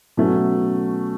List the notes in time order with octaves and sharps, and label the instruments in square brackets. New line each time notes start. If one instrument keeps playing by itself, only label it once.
[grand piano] B2 F#3 A3 C#4 F#4